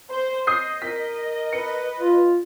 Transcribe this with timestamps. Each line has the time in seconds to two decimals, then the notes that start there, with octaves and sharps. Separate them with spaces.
0.11 C5
0.47 D#5 D#6 G6 C7
0.82 A#4 B6
1.53 B4 C#7
2.00 F4